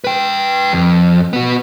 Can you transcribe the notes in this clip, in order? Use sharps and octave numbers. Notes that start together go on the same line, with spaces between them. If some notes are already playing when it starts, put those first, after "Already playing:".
B4 G5
F2
B3 F#4